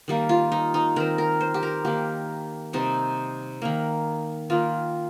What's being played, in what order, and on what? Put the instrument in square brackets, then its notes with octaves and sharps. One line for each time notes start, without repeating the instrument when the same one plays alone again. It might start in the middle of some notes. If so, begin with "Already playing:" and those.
[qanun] D#3 G3 A#3
F4
D#4
D#4
D#3 C4 A#4
A#4
C5
G4
A#4
D#3 A#3 G4
C3 G3 C4 D#4
D#3 A#3
D#3 A#3 F4